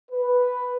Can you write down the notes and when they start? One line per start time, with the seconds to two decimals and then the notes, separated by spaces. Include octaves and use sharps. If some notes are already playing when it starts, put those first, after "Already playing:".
0.11 B4